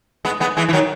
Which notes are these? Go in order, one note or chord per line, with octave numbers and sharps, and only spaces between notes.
G#3 B3
G#3 B3
E3 G#3
E3
D#3 F#3